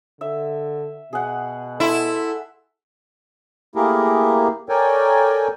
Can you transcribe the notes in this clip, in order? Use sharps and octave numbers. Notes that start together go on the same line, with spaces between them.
D3 E5
B2 G#4 F#5
E4 A4 C6
A3 A#3 E4 G4 G#4 A#4
A4 A#4 C#5 D5 G5 G#5